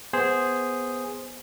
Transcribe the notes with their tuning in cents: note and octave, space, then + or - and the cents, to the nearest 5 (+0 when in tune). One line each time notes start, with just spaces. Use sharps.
B3 +0 G#4 -5 C5 +0